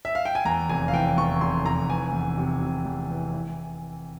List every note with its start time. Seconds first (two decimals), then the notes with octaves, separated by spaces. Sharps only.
0.05 E5
0.15 F5
0.25 G5
0.35 G#5
0.45 E2 A#5
0.69 F1 G#5
0.88 F5
0.93 E3 G5
1.17 E2 C#6
1.41 F1 C6
1.65 F1 A#5
1.89 E3 G#5
2.13 E2
2.38 C3
2.62 C3
2.86 E2
3.10 E3
3.34 E3